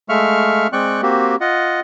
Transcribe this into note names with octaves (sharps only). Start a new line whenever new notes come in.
G#3 A3 E5 F5 C#6 F6
G#3 C4 D5 G5 C#6 F#6
A#3 C4 F#4 G4
F4 D#5 F#5